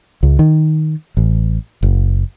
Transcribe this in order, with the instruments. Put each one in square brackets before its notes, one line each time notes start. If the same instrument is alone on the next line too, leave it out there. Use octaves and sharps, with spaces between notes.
[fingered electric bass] C#2
D#3
A1
F#1